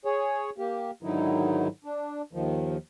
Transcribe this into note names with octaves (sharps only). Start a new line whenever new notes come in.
G#4 C#5
A#3 G4
G#2 D3 D#3 F#3 D#4 E4
D4
D#2 D#3 F3